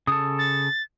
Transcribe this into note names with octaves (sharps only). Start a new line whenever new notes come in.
C#3 A4 D#6
A6